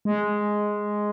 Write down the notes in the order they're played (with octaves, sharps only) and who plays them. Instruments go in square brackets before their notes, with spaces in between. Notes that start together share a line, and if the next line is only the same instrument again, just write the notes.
[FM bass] G#3